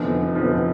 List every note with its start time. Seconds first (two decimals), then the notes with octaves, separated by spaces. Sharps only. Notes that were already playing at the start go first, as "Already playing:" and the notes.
Already playing: F1 E2 D3 F3
0.35 F1 E2 D3 F3